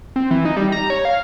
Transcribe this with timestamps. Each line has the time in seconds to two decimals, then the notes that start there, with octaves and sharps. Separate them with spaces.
0.16 C4
0.31 E3
0.45 D#4
0.57 G3
0.72 A#5
0.90 C#5
1.05 F5